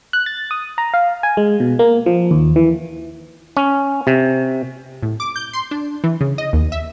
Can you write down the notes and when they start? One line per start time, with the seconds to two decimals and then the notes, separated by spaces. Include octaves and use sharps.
0.13 F#6
0.26 A6
0.51 D#6
0.78 A#5
0.94 F5
1.23 G#5
1.37 G#3
1.60 B2
1.79 A#3
2.06 F3
2.31 D#2
2.56 E3
3.57 C#4
4.07 C3
5.02 A2
5.20 D6
5.36 G6
5.53 C6
5.71 D4
6.04 E3
6.21 C#3
6.38 D#5
6.53 D#2
6.72 E5